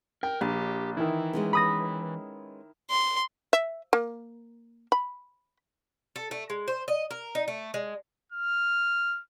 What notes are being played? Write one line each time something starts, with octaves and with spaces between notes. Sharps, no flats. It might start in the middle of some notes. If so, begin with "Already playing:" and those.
A#4 G5
A#1 D4 G4
D#3 E3 E4
G#3 B3 C#4
B5 D#6 A#6
C6
E5
A#3
B5
A4
A3
G#3
C5
D#5
A#4
D#4
A3
G#3
F6